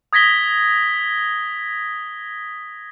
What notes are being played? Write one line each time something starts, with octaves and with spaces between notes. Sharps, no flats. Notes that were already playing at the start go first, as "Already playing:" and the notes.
D#6 G#6 A#6 B6 G7